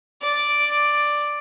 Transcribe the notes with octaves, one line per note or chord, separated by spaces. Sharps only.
D5